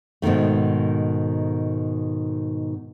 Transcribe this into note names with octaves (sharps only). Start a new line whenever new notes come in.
G#2 B2 D3 D#3 A3